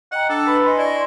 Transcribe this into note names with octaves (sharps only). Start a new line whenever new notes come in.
D#5 F#5 G5 A#5
D4 A4
B4 B5
D#5 G#5 C6
E4 D5 C#6